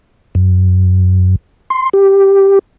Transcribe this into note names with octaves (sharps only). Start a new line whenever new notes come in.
F#2
C6
G4